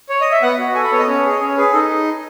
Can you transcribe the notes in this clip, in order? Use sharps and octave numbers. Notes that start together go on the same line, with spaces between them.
C#5
D#5
E5
B3 F#5
F#4
A4 G#5
B5
B3 C#5
D#5
C#4 C#5
G#4
D#5
C#4 C#5
G#4 B4
D#4 A4